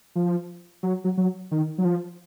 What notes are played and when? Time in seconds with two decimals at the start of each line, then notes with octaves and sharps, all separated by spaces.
0.15 F3
0.83 F#3
1.04 F#3
1.17 F#3
1.51 D#3
1.78 F#3
1.85 F3